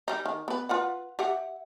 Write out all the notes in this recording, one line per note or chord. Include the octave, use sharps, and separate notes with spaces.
G3 D#4
D#3
B3 B4
F4 B4 F#5
G4 E5 F#5